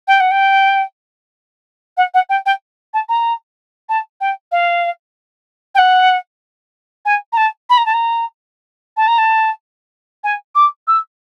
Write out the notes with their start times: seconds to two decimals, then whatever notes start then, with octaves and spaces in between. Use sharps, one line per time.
0.07 G5
0.20 F#5
0.31 G5
1.97 F#5
2.14 F#5
2.29 G5
2.46 G5
2.93 A5
3.09 A#5
3.89 A5
4.20 G5
4.52 F5
5.75 G5
5.78 F#5
7.05 G#5
7.32 A#5
7.37 A5
7.69 B5
7.77 A#5
7.86 A5
7.93 A#5
8.97 A5
9.07 A#5
9.18 A5
10.23 G#5
10.55 D6
10.87 E6